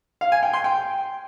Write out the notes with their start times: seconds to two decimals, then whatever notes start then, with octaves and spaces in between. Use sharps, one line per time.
0.21 F5
0.32 G#5
0.43 G5
0.53 C6
0.64 G5